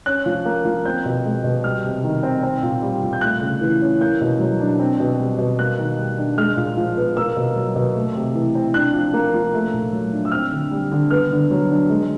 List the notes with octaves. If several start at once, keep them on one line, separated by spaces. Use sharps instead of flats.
C#4 F#6
F3
A#3
F3
C4 G6
B2
G#3
B2
G3 F6
C3
D#3
C4
C4
A#2
G3
A#2
G6
A3 F#6
C#3
E3
C#4
A#3 G6
B2
F#3
D4
C4
B2
G3
B2
A#3 F#6
D#3
G3
D4
G#3 F6
A#2
F3
B3
A#3 E6
B2
F#3
B2
A3
C3
E3
C4
D4 F#6
F3
A#3
F3
A3
A#2
F#3
D4
E6
C4 F6
D3
G3
D3
B3 F6
D3
F#3
D4
G#3